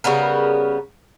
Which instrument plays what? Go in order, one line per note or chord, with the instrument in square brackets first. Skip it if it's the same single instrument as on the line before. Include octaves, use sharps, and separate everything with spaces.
[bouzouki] C#3 G3 B3 A#4